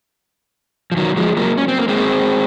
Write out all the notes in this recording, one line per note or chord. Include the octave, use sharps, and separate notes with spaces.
F3
D#3 F#3
F3 G#3
F#3 A#3
C#4
C4
A#3
G#3 C4